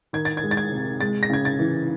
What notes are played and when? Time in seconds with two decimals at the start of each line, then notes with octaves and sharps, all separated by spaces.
0.13 D#3 G#6
0.25 A6
0.37 G#6
0.43 G#3
0.51 A6
0.57 G#6
0.72 C3
1.01 G#3 A6
1.23 A#6
1.30 C#3 G#6
1.45 A6
1.59 E3